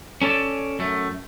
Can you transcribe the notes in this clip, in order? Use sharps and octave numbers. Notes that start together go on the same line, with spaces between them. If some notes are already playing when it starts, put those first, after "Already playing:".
C#4 A4 C#5 D5 A5
F#2 A3